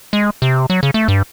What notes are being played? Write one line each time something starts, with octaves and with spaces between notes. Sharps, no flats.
G#3
C3
F#3
C#3
A3
G2